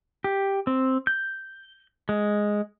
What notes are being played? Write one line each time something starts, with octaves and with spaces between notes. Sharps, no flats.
G4
C4
G6
G#3